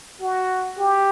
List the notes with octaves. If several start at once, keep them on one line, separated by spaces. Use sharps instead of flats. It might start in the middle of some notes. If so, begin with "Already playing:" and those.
F#4
G4